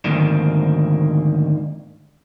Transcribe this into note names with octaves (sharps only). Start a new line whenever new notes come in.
D2 G#2 D#3 F3 A#3 C4